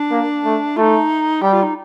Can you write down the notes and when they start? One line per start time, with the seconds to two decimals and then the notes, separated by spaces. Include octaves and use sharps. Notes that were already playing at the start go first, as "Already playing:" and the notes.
Already playing: D4
0.11 A#3
0.45 A3
0.77 A3 D#4 F4
1.42 G3 G4
1.53 F4
1.63 D#4